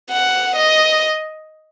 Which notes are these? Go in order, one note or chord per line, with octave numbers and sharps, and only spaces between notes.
F#5
D#5